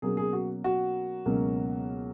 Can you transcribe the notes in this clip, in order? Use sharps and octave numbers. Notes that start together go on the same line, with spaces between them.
B2 F#3 A#3 C#4 G#4
G#4
F#4
F#4
C#2 B2 F#3 A#3 C#4